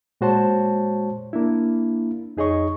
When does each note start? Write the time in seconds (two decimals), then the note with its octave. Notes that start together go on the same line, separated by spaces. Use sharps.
0.21 A#2 G#3 F#4 C5 C#5 A5
1.33 A#3 D4 E4
2.37 F2 D#4 G#4 C#5 D#5 C#6